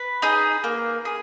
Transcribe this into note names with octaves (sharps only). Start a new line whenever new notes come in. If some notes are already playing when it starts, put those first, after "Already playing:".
Already playing: B4
D#4 G#4
A#3
G#4